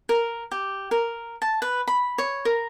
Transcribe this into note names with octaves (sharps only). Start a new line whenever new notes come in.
A#4
G4
A#4
A5
B4
B5
C#5
A#4